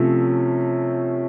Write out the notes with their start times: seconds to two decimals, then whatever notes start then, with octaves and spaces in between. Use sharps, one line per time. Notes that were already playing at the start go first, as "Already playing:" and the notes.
Already playing: C3 F3 A3 C#4